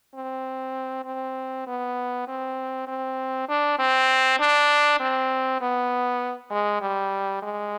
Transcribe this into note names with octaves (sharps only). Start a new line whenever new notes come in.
C4
C4
B3
C4
C4
D4
C4
D4
C4
B3
G#3
G3
G#3